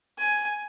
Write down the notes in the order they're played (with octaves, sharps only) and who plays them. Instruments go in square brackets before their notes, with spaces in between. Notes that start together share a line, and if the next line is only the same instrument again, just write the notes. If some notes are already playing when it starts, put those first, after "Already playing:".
[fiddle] G#5